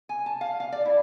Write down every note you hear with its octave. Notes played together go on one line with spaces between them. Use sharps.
G#5
A5
F5
F5
D5
E4